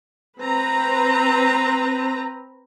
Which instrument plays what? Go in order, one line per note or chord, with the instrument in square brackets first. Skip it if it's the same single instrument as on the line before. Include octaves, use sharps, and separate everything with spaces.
[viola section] C4 B4 A#5